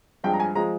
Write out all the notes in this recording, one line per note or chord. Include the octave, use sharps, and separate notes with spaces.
G2 F3 G#3 G5
A#5
G#5
F3 G#3 A#5